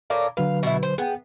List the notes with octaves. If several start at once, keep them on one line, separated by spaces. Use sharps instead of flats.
A2 A#4 D5 F5
D3 F#3 B4 F5
B2 E4
C5
B3 G#4 G5